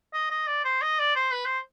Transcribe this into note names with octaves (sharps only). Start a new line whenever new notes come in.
D#5
D#5
D5
C5
D#5
D5
C5
B4
C5